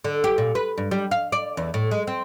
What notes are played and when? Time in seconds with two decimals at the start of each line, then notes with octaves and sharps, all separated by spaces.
0.04 D3
0.24 G4
0.38 A#2
0.55 B4
0.78 G2
0.91 G3
1.11 F5
1.32 D5
1.57 E2
1.74 A2
1.91 G#3
2.07 C4